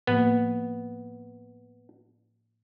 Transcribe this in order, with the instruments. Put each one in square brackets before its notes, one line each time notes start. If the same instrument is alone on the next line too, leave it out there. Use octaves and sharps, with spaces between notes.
[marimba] A2 F3 A#3 [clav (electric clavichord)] B3